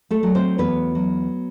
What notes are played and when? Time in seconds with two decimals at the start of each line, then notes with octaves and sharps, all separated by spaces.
0.11 A3 A4
0.23 F#3
0.35 C4 C5
0.58 E2 B3 B4
0.95 F#3